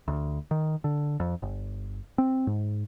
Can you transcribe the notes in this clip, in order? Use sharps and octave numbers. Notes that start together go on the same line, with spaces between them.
D2
D#3
D3
F2
G1
C4
G#2